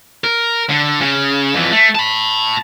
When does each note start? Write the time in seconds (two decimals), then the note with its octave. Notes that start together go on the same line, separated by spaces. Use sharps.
0.24 A#4
0.70 D3
1.01 C#3
1.54 F2 E3
1.72 A3
1.95 A5 B5